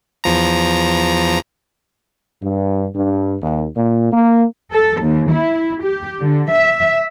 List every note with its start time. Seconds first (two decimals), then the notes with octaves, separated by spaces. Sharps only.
0.24 E2 F3 A#5
2.42 G2
2.93 G2
3.40 D#2
3.75 A#2
4.11 A#3
4.71 A4
5.00 D#2
5.30 E4
5.82 G4
6.21 D3
6.51 E5